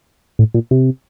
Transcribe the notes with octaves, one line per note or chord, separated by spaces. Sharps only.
A2
A#2
C3